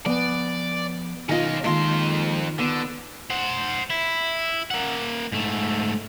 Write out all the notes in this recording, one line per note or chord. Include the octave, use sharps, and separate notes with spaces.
F3 B3 B4 D5 G#5
B1 D#3 C#4 F4 A#4 D#5
F2 D#3 G#3 A#3 F4 A4 A#4 C6
D3 B3
C5 F#5
E4
A#3 F#5
G#2 A3